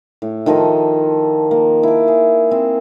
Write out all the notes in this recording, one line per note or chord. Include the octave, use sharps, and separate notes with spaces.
A2
D#3 F3 A4 D#5
A#3
E4 D6
G#4
C4